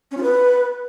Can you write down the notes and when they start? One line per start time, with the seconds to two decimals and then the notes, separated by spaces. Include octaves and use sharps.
0.12 C#4
0.17 F4
0.23 B4